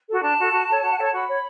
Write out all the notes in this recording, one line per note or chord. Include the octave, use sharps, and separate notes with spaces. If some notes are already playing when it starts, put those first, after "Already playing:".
F#4 A4
D4 A5
F#4 A4
F#4
A4 C#5
F#4
F#5
A4 G5
C#5 A5
F#4 B5
C#5